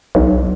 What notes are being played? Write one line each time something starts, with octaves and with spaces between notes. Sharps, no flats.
B1